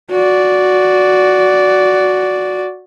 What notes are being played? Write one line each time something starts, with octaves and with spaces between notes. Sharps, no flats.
F#4 D5